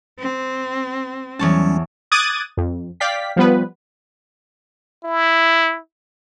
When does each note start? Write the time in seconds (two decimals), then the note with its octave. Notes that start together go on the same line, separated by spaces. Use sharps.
0.19 C4
1.39 E2 F#3 G3 C#4 C#5 A5
2.12 D6 D#6 F#6 G#6 A6 D#7
2.57 F2
3.00 D5 F5 G5 B6
3.36 F3 G3 B3 B4
5.05 E4